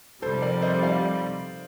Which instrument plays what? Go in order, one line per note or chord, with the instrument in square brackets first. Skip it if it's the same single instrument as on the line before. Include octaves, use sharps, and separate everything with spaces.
[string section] F2 C3 G3 [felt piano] A4 C5
[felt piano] A#4 D5
C5 D#5
D5 F5